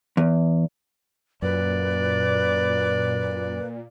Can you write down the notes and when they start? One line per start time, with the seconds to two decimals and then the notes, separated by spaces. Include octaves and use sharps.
0.17 E2
1.42 F#2 A#2 B4 D5